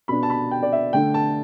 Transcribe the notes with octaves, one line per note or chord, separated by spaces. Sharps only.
B2 B3 D4 B5
A5
B5
G5
D5
E5
D3 A3 D4 G5
A5